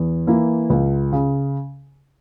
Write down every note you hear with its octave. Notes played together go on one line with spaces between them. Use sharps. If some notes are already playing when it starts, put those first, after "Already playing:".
Already playing: E2
E3 A#3 E4
C#2
C#3